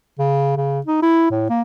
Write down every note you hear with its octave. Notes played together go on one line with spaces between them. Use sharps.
C#3
C#3
D#4
E4
A2
A#3